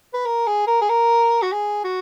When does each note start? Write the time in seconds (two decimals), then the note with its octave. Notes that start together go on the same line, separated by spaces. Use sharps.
0.14 B4
0.26 A#4
0.47 G#4
0.68 A#4
0.82 G#4
0.89 A#4
1.42 F#4
1.52 G#4
1.84 F#4